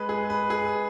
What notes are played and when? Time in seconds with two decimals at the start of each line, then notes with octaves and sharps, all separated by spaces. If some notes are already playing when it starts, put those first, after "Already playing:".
Already playing: G#3 B4
0.09 G#4
0.30 B4
0.50 G#4